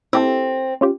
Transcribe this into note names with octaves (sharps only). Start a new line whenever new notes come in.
C4 E4 G4 A4
C#4 F4 G4